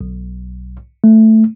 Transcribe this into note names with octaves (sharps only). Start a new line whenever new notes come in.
B1
A3